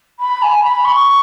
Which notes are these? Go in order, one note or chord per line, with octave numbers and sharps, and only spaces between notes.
B5
G#5
B5
C#6